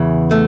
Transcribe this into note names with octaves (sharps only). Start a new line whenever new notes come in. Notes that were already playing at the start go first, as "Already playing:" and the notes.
Already playing: E2 C#3 E3
A3